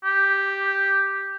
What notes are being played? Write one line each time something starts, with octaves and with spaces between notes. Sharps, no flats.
G4